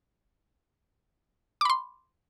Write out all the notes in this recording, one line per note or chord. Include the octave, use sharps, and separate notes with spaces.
B5 C6 D6